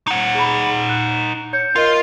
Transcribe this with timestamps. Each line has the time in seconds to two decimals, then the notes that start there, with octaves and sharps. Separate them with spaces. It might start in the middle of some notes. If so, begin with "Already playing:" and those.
0.07 D#4 F#5
0.35 G#4 B5
0.89 F#6
1.53 C#5 G6 C#7
1.76 F4 A#4 D#5